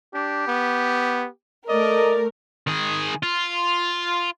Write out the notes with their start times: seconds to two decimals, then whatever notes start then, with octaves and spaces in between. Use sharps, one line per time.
0.14 D4 G4
0.47 B3
1.69 A3 A#4 D5 D#5
2.67 D#3 G#4
3.23 F4